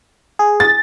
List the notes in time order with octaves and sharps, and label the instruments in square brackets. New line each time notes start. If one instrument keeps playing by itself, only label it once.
[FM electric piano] G#4
[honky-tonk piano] A6